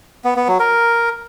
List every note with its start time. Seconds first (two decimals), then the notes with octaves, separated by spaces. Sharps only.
0.24 B3
0.36 B3
0.48 F#3
0.60 A#4